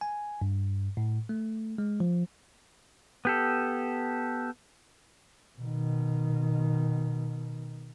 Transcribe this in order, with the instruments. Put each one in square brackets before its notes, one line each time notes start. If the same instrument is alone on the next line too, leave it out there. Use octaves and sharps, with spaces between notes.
[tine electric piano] G#5
G2
A2
A3
G#3
F3
[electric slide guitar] B3 G4 A4
[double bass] B2 D#3